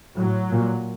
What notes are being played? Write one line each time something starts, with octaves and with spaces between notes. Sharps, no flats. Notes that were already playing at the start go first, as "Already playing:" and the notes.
A2 F#3
A#2